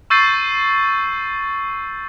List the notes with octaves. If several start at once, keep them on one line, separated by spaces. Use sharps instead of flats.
C#6 E6 G6 A6 C7 D#7